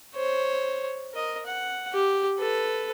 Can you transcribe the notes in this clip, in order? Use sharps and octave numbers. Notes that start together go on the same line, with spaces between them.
C5 C#5
A#4 D#5
F#5
G4
A4 B4